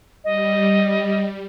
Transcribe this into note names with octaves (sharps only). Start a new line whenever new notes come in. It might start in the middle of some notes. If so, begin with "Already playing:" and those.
G3 D#5